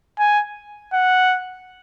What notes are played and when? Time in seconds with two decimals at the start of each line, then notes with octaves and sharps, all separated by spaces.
0.19 G#5
0.93 F#5